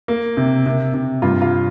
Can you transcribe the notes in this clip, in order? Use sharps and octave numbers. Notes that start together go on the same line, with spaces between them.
A#3
C3
C3
C3
G2 F4
F4